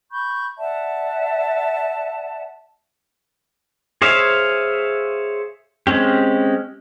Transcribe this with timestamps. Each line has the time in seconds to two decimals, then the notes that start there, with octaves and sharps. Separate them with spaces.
0.11 B5 C#6 G6
0.59 D5 E5 F#5 A5
4.02 G#4 C5 C#5 E5 F5
5.87 G#3 C4 C#4 G4